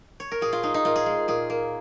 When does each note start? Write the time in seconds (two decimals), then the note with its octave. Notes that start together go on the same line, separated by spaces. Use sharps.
0.20 C#5
0.32 A#4
0.41 A#2 G#4
0.53 F4
0.63 G#3 D#4
0.74 D#4
0.85 A#2 F4
0.96 G#4
1.06 G#3
1.28 A#2 G#4
1.50 A#3